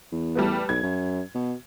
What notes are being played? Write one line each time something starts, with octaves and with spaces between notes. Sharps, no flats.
E2
G3 A3 B3
B1 G#6
F#2
B2